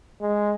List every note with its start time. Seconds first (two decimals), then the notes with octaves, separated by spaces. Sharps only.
0.21 G#3